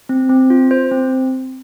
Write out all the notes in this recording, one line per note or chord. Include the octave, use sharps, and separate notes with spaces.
C4
C4
F4
C5
C4